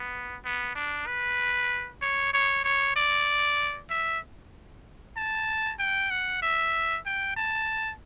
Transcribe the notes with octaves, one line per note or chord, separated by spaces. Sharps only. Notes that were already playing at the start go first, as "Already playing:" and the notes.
Already playing: B3
B3
D4
B4
C#5
C#5
C#5
D5
E5
A5
G5
F#5
E5
G5
A5